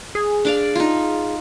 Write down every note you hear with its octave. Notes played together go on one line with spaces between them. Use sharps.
G#4
D4 D5 F5
D#4 F4